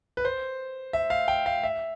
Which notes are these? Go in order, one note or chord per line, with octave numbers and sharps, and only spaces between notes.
B4
C5
E5
F5
G5
F5
E5